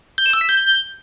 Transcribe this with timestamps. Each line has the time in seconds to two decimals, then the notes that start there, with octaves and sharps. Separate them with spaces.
0.18 G6
0.26 E7
0.33 E6
0.41 B6
0.49 G6